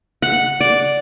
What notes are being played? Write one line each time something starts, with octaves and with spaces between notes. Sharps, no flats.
F#5
D5